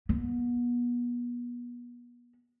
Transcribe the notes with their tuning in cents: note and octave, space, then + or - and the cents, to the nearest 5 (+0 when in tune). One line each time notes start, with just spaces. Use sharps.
B3 -35